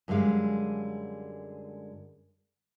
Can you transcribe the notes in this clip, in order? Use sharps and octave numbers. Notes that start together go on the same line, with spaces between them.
F#2 D3 G3 G#3 F5